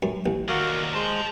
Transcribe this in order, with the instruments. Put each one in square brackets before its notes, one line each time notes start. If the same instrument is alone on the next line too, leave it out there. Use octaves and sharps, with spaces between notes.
[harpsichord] F#2
A1
[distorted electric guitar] D#2 D3 [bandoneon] F#4 A#4 F5
[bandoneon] G#3 C5 [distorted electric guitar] A5 C6